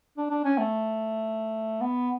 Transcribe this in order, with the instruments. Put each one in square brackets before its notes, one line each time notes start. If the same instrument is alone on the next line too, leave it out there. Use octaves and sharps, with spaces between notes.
[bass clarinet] D4
D4
C#4
A3
B3